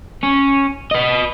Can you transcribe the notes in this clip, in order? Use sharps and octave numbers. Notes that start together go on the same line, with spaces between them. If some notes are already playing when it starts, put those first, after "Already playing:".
C#4
B4 D#5